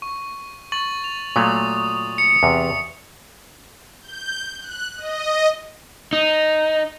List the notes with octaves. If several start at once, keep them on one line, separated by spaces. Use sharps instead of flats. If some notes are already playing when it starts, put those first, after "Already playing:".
C#6
C#6 A6 F#7
F7
A#2 F#3 A3 D#6
C#7
E2 C3
G6
F#6
D#5
D#4